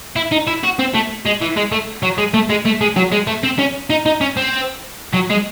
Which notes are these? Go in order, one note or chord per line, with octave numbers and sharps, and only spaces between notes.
E4
D#4
E4
F#4
C4
A3
G#3
E3
G#3
A3
F#3
G#3
A3
G#3
A3
G#3
F#3
G#3
A3
C4
C#4
D#4
D#4
C#4
C4
F#3
G#3